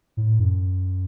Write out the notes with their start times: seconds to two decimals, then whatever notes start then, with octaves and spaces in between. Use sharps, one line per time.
0.17 A2
0.39 F#2